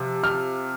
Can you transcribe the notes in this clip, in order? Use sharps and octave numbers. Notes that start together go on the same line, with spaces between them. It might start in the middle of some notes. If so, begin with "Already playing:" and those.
Already playing: C3 F3
F6